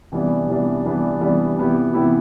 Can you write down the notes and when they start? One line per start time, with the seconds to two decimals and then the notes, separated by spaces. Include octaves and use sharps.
0.12 C3 E3 G3 B3 D4
0.48 C3 E3 G3 B3 D4
0.85 C3 E3 G3 B3 D4
1.20 C3 E3 G3 B3 D4
1.58 C3 E3 B3 E4 G4
1.93 C3 E3 B3 E4 G4